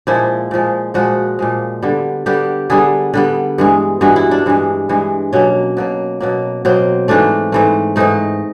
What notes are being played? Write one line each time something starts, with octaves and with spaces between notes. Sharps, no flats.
A#2 F3 G#3 E4
A#2 F3 G#3
A#2 F3 G#3 F#4
A#2 F3 G#3
D3 G3 B3
D3 G3 B3 G4
D3 G3 B3 G#4
D3 G3 B3
G2 E3 G#3
G2 E3 G#3 F#4
E4
D4
G2 E3 G#3
G2 E3 G#3
B2 F#3 A#3 C#4
B2 F#3 A#3
B2 F#3 A#3
B2 F#3 A#3 C4
G#2 E3 A3 D4
G#2 E3 A3
G#2 E3 A3 D#4